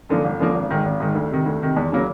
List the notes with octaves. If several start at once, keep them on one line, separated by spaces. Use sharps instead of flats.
F#2 D3 F3 A#3
G1
F#2 D3 F3 A#3
G#1
G#2 D#3
G#1
G#2 D#3
D2
C3 D#3
D2
C3 D#3
E2
C#3 F#3 A#3